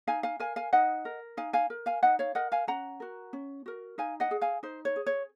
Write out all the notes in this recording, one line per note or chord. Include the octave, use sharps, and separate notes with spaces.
D#4 F5 G#5
F5 G#5
A#4 F5 G#5
F5 G#5
D#4 D#5 F#5
A#4
D#4 F5 G#5
F5 G#5
A#4
F5 G#5
D#4 D#5 F#5
C#5 F5
A#4 D#5 F#5
F5 G#5
C#4 F#5 A#5
F#4 A#4
C#4
F#4 A#4
D#4 F5 G#5
D#5 F#5
G#4
F5 G#5
D#4 C5
C#5
G#4
C#5